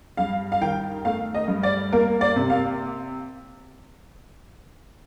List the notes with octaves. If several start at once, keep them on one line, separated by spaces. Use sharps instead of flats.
G2 F5
F5
D#3 G5
A3 F5
D#5
G2
D5
A#3 A#4
D5
C3
F5